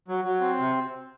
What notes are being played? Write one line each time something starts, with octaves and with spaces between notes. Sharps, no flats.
F#3
F#3
C4
C3